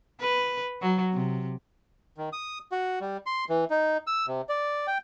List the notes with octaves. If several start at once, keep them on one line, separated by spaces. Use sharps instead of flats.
B4
F#3
C3
D#3
D#6
F#4
G3
C6
E3
D#4
E6
C3
D5
G5